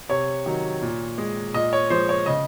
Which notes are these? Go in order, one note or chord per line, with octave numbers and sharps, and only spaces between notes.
C3 C#5
D#3 F#3
A#2
G#3
A#2 D#5
C#5
F3 G#3 C5
C#5
C#3 D#5